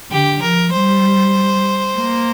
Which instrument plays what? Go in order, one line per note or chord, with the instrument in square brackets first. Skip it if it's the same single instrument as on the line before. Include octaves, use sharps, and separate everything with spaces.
[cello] D3 [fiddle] G4
[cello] F3 [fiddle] A#4
[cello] G3 [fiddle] C5
[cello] A#3